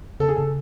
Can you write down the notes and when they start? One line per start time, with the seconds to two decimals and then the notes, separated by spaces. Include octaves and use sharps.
0.20 C#3 A4
0.28 G#4
0.37 C#3 A4